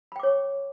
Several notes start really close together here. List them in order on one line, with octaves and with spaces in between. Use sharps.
B5 G5 D6 C#5 C#6